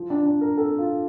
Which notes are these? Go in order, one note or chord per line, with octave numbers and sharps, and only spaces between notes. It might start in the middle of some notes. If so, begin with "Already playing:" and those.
Already playing: F3
D4
D4
A#4
A4
F4